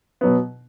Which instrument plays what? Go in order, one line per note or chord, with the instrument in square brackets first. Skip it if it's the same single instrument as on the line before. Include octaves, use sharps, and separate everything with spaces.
[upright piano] B2 F#3 B3